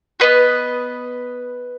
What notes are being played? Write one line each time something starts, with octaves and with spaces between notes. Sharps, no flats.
B3 F#4 B4 D#5